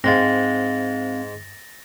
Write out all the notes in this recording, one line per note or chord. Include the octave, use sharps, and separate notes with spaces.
G#2 G#3 C4 F5 A6 A#6